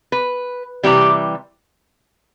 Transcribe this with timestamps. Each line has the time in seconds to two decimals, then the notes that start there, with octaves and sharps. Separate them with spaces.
0.12 B4
0.84 C3 E3 G3 G4